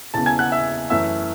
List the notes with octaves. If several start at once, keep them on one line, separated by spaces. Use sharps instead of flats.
E1 E2 C#3 E3 A5 A6
G#5 G#6
F#5 F#6
E5 E6
F#2 E3 A3 E5 E6